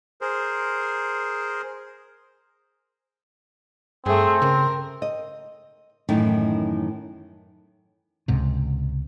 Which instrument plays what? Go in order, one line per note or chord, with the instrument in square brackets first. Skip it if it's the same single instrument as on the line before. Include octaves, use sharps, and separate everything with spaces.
[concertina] G#4 A#4 C5
[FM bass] G2 [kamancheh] A3 G#4 [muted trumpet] C4
[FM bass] C#3 [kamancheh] A#4
[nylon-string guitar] D#5
F#2 A2 D#3 E3 D#4
[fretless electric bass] C#2 G#2 C3